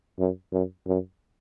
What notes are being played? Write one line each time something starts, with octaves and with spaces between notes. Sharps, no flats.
F#2
F#2
F#2